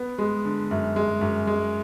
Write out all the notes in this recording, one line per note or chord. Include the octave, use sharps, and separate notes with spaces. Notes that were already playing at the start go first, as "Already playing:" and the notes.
Already playing: B3
G#3
D3
F#2
G#3
F#2
G#3